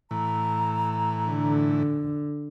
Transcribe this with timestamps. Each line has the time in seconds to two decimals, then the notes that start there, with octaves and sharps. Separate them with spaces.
0.11 A2 E3 A#5
1.28 D3